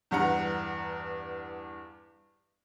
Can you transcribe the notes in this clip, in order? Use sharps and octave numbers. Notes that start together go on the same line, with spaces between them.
E2 G2 F#5 A#5